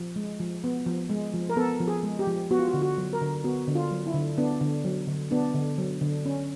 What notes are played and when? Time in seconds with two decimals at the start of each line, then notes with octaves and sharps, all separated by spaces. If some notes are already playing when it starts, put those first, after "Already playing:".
Already playing: F3
0.16 G#3
0.40 F3
0.64 B3
0.86 F3
1.09 G#3
1.34 F3
1.49 A#4
1.56 B3 A4
1.80 F3
1.88 G#4
2.03 G#3
2.19 G4
2.27 F3
2.51 B3 F#4
2.59 F4
2.68 F#4
2.74 D3
2.82 F#4
2.98 F#3
3.13 A#4
3.21 D3
3.44 B3 F#4
3.67 D3
3.75 F4
3.91 F#3
4.07 E4
4.14 D3
4.38 B3 D4
4.61 D3
4.85 F#3
5.07 D3
5.31 B3 D4
5.55 D3
5.78 F#3
6.01 D3
6.25 C#4